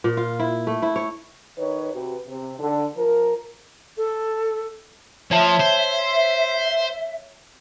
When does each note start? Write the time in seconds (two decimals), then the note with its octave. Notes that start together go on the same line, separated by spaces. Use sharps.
0.04 A#2
0.17 F4
0.40 E4
0.67 A3
0.82 E4
0.96 C#5
1.58 D#3 B4 C#5
1.93 C3 F#4 G4 B4
2.28 C3
2.60 D3
2.95 F3 A#4
3.97 A4
5.31 F3 C#5 E5 A5
5.60 C5